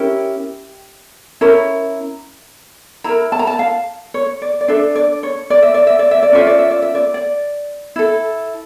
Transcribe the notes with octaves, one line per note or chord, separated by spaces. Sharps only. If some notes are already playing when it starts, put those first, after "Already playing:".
Already playing: C#4 E4 G4 A#4 G5
C#4 E4 A#4
E4 A#4 A#5
A5
A#5
A5
F5
C#5
D5
D5
D4 A4 E5
D5
C#5
D5
E5
D5
E5
D5
E5
D5
C#4 F4 A4 E5
D5
E5
D5
E5
D5
D5
E4 A4